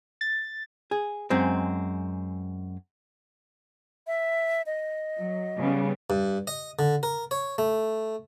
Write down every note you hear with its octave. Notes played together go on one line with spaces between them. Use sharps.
A6
G#4
F#2 G#3 C4
E5
D#5
F#3
C#3 G3 B3
G2
D#5
D3
A#4
C#5
A3